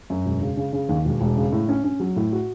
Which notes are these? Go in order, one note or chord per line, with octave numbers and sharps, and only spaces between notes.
F#2
E1
C#3
C#3
C#3
D#2
E1
E1
C#3
A2
C#4
C#4
F#3
A2
F#4